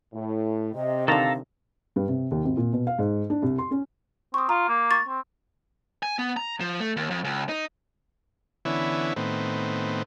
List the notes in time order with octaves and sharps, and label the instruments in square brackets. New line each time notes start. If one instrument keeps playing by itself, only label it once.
[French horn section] A2
[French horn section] C3 [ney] D#5
[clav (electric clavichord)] D3 D#3 [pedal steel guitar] A4 A5 A#5 [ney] F5
[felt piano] G2
C3
D#2
G#1
A#2
B2
F5
G#2
D4
C2
C6
C#4
[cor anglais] C4 [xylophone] C#6 D#6
[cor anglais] F4 [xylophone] A#5
[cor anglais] A#3
[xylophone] C#6 A6
[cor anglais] C4
[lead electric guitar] G#5
B3
A#5
F3
A3
D#2
F2
C#2
D#4
[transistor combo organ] D3 E3 B3 C#4 E4
A2 D#3 B3 C4